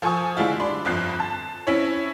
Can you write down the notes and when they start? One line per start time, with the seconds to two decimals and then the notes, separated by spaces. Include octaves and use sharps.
0.02 F3 A4 C5 G#5 C#6 D#6
0.37 D3 G3 G#3 E4 F4
0.60 D4 B5 C6
0.85 G1 F2 F3 F#6 C7
1.20 A5
1.67 C4 C#4 E4 C#5